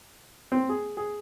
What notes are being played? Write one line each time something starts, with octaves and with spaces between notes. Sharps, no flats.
C4
G#4
G#4